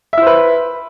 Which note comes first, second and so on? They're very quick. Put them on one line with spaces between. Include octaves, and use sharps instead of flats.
E5 E4 C5 B4